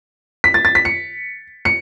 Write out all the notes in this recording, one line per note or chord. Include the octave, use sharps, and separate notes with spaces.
B6
A6
A6
B6
C#7
C#7